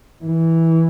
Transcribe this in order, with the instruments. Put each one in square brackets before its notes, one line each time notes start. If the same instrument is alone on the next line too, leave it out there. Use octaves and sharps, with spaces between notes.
[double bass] E3